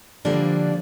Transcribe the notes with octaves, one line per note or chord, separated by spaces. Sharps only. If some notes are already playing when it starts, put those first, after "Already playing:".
D3 F3 G3 A#3 D4